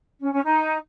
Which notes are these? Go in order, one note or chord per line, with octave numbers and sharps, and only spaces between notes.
C#4
C#4
D#4